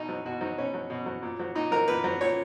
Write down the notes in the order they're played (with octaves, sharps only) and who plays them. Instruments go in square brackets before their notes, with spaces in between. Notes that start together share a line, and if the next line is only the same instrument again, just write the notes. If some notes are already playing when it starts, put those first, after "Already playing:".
Already playing: [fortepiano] B2 D#4
F#3
B2 F#4
F#3 D#4
B2 C#4
F#3
B2
F#3
A#2
F#3
A#2 D#4
F#3 A#4
A#2 B4
F#3
A#2 C#5